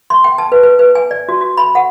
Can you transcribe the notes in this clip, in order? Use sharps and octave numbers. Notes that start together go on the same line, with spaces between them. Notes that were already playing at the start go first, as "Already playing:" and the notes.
C6
G5
A5
B4
B4
B4
G#5
D5
F#4
F#4
B5
F#5